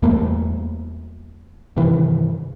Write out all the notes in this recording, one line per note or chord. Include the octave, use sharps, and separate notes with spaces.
E2 G3 A3 A#3
G2 C3 D#3 E3